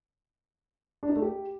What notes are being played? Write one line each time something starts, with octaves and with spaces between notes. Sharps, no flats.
D4
D#4
A3
G4